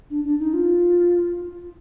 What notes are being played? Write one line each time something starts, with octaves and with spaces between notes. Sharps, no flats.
D4
D4
D#4
F4